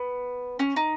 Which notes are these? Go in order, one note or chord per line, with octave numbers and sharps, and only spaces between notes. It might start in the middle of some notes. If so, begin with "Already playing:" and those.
Already playing: B3
C#4
D#4